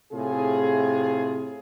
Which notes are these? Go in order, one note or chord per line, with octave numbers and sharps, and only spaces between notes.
A2 C3 F4 G#4